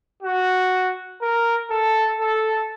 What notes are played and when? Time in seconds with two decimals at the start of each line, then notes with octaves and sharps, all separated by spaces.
0.23 F#4
1.21 A#4
1.70 A4
2.20 A4